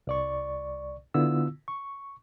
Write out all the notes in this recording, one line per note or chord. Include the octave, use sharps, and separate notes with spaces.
C2 D5 C#6
D3 B3 E4 F4 E6
C#6